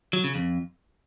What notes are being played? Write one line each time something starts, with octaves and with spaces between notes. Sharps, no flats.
F#3
C#3
F2